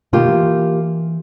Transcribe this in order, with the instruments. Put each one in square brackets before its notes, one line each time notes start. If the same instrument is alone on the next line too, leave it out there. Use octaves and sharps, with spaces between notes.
[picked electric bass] B2 D3 D#3 [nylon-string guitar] A#3 F4 G4
[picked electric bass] E3